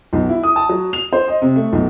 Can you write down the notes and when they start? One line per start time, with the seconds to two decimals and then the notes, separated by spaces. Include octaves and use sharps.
0.13 B1
0.29 E4
0.44 D#6
0.56 A5
0.69 F#3
0.93 F7
1.13 C5
1.28 D#5
1.42 C3
1.56 A3
1.73 B1